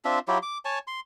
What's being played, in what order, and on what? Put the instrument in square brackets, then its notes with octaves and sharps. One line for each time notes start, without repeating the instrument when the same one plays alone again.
[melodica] C4 D4 F4 E5
F#3 E4 F4 G4
D6
C#5 G#5 A5
C6